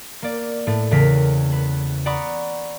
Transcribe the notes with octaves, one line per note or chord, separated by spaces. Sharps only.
A#3 D5
A2 A3
E2 C#3 A#4 B6
B4
D5 F#5 A#5 B5 C#6 D#6